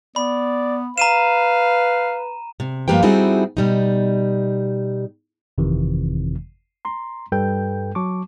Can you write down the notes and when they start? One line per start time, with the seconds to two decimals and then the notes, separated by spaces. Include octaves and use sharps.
0.16 B3 D5 B5
0.98 B4 F5 A#5 D#7 E7
2.60 C3
2.88 G2 F3 A#3 G4 B4 G5
3.03 G3 C4 D#4 E4 F#4 G#4
3.57 B2 G3 D#4
5.58 G1 F2 C3 D#3 E3
6.85 A#5 C6
7.32 G2 G3 A4 B4 G5 G6
7.95 F#3 A5 C#6 D6